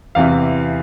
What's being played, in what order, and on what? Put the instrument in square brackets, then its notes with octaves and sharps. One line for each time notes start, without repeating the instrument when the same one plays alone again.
[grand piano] E2 C3 E3 F5